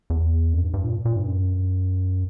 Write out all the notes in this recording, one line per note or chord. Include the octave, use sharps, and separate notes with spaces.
E2
F#2
G2
G2
A#2
A#2
G2
F#2